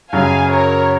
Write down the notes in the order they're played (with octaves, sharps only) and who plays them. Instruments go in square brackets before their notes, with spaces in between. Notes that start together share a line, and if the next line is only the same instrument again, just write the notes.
[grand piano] F#2 C#3 F#3 [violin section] F5 G#5
[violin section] A#4 C#5